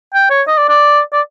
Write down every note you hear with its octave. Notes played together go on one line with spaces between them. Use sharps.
G5
C#5
D#5
D5
D5
D5